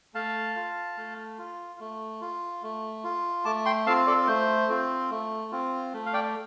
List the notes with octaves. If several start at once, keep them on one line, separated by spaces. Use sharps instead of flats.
A3 F5 A5
F4
A3
F4
A3
F4
A3
F4
A3 A5 D6
G5 C6
C4 F4 F5 A5
A4 D5
A3 C5
C4 F4
A3
C4 F4
A3
F5
D5 G5